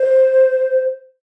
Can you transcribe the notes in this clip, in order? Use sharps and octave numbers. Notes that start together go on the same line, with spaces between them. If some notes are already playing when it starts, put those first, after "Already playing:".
Already playing: C5